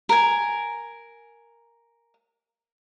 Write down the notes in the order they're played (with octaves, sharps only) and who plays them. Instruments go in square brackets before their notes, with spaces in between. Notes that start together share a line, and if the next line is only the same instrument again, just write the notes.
[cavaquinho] A#4 G#5